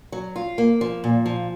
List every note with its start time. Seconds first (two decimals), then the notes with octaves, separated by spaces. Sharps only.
0.12 F#3
0.36 F4
0.58 A#3
0.81 F3
1.04 A#2
1.26 F3